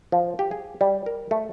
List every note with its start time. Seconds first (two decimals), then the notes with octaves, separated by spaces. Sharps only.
0.12 F3
0.39 G4
0.51 G#4
0.81 G3
1.06 A#4
1.31 A3